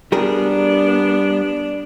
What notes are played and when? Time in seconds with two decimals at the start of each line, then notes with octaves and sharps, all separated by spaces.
0.12 G3 B3 D4 G#4 A#4